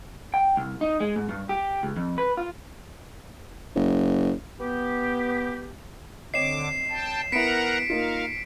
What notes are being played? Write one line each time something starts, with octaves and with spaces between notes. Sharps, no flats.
G5
C2
D#4
G#3
G#2
G2
G4
C#2
F2
B4
F4
F#1
B3 G4
D3 C4 C#5 D#5 D6 C7 E7
G5 A5
B3 E4 A#4 F#5 A#5 B6 C#7 D7
A#3 D#4 F4 A#4 F5